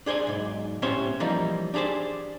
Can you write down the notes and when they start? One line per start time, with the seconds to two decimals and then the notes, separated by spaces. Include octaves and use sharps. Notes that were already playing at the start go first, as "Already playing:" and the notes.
0.06 D4 G#4 C5 D5 G#5
0.27 B1 G#2
0.82 A2 B3 C#4 G4 C5 C#5
1.20 E3 F3 G3 A#3 D#4
1.74 D4 G4 G#4 C5 D5